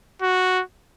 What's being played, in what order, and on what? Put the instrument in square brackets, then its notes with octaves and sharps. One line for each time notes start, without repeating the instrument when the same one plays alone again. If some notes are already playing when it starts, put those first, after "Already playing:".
[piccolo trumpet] F#4